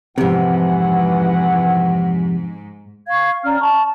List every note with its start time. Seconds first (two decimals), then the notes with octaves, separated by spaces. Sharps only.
0.18 F2 G#2 C3 E3 F#5
3.08 F5 C#6 G#6
3.44 C#4 D5 A#5 F6
3.60 A5 C#6